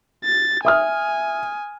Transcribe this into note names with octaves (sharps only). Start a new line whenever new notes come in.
A6
E5 G#5 D#6 F6